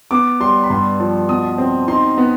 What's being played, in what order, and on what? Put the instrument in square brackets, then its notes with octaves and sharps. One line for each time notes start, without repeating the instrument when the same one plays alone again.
[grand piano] B3 D6
G3 C6
B5
G2 C6
F3
B2 D#6
C4
D#4 C6
B3